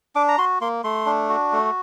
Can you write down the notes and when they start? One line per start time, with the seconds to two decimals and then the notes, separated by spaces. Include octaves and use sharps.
0.16 D4 D6
0.28 A#5
0.38 F#4 C6
0.61 A#3 C6
0.84 A3 C6
1.06 D4
1.29 F#4
1.52 A3